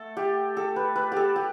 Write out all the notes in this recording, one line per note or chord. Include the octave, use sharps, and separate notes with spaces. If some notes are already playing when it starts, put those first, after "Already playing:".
Already playing: A3 A4
G4
A4
B4
B4
G4 A4
G4